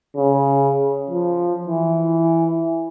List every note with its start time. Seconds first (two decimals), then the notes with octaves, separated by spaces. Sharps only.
0.17 C#3
1.10 F3
1.67 E3